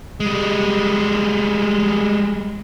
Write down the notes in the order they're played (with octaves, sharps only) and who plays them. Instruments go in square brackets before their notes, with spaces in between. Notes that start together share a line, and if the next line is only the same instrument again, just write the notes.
[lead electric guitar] G3 G#3